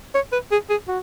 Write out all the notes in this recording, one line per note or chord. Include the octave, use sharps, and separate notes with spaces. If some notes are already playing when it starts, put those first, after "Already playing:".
C#5
B4
G#4
G#4
F#4